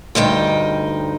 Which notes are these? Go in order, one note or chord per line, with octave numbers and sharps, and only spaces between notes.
D2 G2 D#4 G5